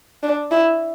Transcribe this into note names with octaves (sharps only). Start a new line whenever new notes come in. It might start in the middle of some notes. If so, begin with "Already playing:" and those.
D4
E4